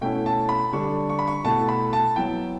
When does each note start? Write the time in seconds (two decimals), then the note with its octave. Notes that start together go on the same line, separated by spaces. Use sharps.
0.01 B2 A3 C#4 E4 G5
0.26 A5
0.49 B5
0.73 D3 G3 D4 C#6
1.09 C#6
1.19 B5
1.27 C#6
1.44 B2 A3 E4 A5
1.69 B5
1.93 A5
2.16 F#3 B3 E4 G5